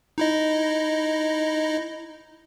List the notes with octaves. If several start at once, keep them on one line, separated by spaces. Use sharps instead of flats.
D#4 E4 D#5